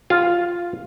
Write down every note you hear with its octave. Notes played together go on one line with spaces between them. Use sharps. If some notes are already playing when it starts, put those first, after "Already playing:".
F4